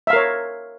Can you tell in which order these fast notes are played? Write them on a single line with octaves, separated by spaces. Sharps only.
E5 F5 A#4 C#5